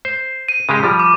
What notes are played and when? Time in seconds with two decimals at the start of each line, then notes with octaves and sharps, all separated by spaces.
0.05 C5
0.49 D#7
0.69 C#3 G#3 G4 D#7
0.83 F3 G3
1.00 D6